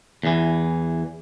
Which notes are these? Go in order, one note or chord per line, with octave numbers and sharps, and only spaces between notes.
E2 E3